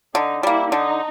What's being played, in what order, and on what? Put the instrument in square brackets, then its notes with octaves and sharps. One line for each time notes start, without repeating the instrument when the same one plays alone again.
[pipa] D3 [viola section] D#4
[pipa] G3 A#3 [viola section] E4
[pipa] D3 [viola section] D#4